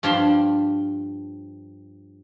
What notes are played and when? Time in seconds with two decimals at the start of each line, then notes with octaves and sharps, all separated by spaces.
0.03 G2 F3 D4 F5 B5 C6